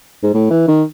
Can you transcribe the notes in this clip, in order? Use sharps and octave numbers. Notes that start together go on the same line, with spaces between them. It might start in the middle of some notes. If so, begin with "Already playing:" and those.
G#2
A2
E3
D#3